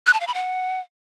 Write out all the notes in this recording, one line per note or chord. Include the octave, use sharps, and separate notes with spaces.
F#6
A5
F5
B5
F#5